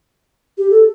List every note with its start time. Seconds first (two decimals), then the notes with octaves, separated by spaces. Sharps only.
0.58 G4
0.71 A4